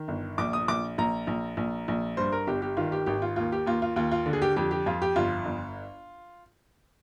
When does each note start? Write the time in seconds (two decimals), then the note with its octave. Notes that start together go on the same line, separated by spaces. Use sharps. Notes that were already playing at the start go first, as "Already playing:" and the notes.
Already playing: D#3
0.08 G1
0.38 A#1 D6
0.53 D#6
0.68 A#1 D6
0.98 A#1 A#5
1.27 A#1
1.57 A#1
1.88 A#1
2.17 G2 C5
2.32 A#4
2.47 G1 G4
2.62 G4
2.77 D#3 F4
2.92 G4
3.06 G#1 G4
3.22 F4
3.36 D#2 F4
3.52 G4
3.66 D#2 F4
3.82 F4
3.96 D#2 F4
4.12 F4
4.26 D3
4.33 G#4
4.42 G4
4.56 F2 G4
4.71 G4
4.86 F2 F4
5.02 G4
5.16 G1 F4
5.45 G1